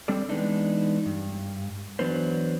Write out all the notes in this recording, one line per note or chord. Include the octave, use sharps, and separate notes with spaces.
G3 C4 D4 A4 D5
E3 G#3 B3 D4 D#4
G2
E3 F#3 B3 D4 B4 C5